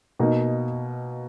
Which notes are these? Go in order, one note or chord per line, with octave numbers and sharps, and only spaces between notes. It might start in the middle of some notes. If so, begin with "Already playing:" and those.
B2 A#3 D#4